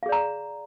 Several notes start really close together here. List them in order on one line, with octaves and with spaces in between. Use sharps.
F5 G#4 D5 A#5